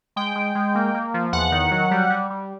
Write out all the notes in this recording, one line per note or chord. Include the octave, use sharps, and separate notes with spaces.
G#3 G5
G#3
G#3
A#3
A#3
F3
E2 F#5
D#3
F#3
G3
G3
G3